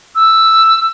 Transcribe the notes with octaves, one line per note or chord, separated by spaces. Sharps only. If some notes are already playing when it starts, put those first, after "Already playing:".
E6